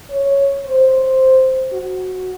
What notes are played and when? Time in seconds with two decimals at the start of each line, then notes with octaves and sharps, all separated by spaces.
0.10 C#5
0.65 C5
1.72 F#4